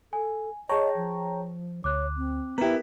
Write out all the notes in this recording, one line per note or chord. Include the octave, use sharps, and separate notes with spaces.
A4 G#5
G#4 C#5 D#5 G5 A5 A#5 C#6
F3
D2 C#5 D6 F#6
C4
B3 E4 G4 A#4